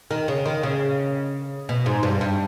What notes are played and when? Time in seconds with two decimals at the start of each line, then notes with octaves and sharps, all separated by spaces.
0.11 D#3
0.28 C#3
0.46 D#3
0.63 C#3
1.69 B2
1.86 G#2
2.03 G2
2.21 G2